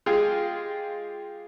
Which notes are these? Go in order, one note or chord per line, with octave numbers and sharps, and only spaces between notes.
G#3 F4 G4 G#4